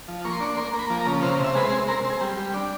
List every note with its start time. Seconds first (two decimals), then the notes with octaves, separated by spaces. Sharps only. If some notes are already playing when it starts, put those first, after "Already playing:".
0.08 F3
0.25 A#3 C#6
0.32 C6
0.40 D4 C#6
0.57 A#3 C6
0.73 A#3
0.79 B5
0.90 F3
1.01 A#5
1.06 C#3
1.22 C3 F5
1.39 C3
1.44 E5
1.55 G#3 B4
1.66 C5
1.72 C4
1.88 C4 A#4
2.04 C4
2.10 G#4
2.21 G3
2.37 G3
2.54 D4